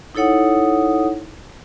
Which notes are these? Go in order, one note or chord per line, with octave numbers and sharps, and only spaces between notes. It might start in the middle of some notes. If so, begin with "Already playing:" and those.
D#4 E4 A4 C#5 F#5 D#6